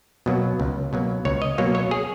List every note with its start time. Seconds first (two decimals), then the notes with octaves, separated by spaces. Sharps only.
0.26 B2 F#3 A#3
0.60 C#2
0.93 B2 F#3 A#3
1.25 C#2 C#5
1.42 D#5
1.58 B2 F#3 A#3 C#5
1.75 C#5
1.91 G#4